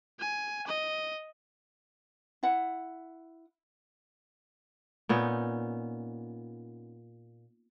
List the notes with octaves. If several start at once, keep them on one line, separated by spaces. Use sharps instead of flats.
G#5
D#5
E4 F#5
A#2 B3 C#4 D#4